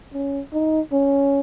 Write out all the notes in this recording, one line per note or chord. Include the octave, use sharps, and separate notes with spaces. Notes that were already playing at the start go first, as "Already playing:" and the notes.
C#4
D#4
C#4